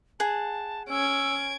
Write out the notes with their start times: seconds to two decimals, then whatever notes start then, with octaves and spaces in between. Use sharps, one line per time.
0.20 G#4 F#5 A5
0.90 C#4 E6 G#6 D7